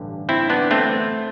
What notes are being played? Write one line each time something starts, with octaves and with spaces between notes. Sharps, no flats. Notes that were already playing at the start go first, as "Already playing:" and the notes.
Already playing: A1 G2 D3
C4 E4
B3 D4
A3 C4